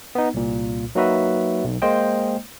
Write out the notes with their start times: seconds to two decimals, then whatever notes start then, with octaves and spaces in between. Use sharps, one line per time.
0.15 B3 D#4
0.34 C2 A#2
0.95 F#3 A#3 D#4 F#4 B4 E5
1.64 B1
1.82 G#3 A#3 C5 D#5 G5